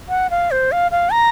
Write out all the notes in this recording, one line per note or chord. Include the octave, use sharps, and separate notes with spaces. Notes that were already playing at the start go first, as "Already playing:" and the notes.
F#5
F5
C5
F5
F5
A#5